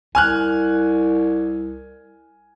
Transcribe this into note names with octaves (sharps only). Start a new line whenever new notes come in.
C2 G#5 F6 F#6